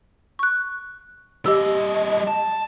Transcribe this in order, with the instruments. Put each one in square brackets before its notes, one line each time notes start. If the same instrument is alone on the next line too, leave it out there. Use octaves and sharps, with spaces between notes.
[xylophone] C#6 F#6
[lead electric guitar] G3 D#5 [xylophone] G4 E6
[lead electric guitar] A5